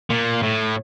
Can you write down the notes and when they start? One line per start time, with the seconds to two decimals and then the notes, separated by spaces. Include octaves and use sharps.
0.10 A#2
0.43 A2